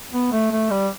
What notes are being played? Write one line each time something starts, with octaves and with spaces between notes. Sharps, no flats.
B3
A3
A3
G3